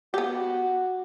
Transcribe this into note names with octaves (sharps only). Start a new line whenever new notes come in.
B3 F#4 G4